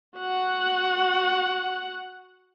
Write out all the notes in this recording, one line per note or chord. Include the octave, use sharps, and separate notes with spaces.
F#4 F#5